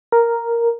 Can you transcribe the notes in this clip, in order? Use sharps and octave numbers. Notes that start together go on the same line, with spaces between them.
A#4